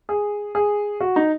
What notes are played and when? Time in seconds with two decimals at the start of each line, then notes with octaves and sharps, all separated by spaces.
0.09 G#4
0.55 G#4
1.00 F#4
1.16 D#4